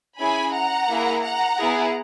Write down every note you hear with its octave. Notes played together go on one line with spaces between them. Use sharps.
C#4 E4 G#4 G#5 B5
F#5 A#5
A#3 E4 G#4
F#5 A#5
B3 E4 G#4